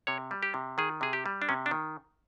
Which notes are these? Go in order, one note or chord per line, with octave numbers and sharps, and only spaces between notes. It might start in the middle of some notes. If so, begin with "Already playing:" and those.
C3 C#5
G3
G4
C3
D#3 G#4
C3 G#4
G4
G3
D4
C3 C#4
D4
D#3